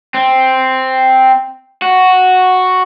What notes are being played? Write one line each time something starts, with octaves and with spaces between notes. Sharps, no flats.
C4
F#4